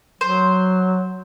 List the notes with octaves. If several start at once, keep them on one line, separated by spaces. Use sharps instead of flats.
F#3 C5